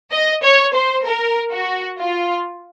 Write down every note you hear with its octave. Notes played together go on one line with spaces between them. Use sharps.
D#5
C#5
C5
A#4
F#4
F4